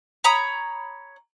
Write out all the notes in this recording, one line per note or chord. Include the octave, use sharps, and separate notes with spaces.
C#5 A#5 B5 D#6